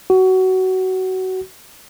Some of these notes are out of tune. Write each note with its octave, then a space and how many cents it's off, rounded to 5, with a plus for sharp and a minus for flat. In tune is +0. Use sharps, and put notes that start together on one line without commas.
F#4 +20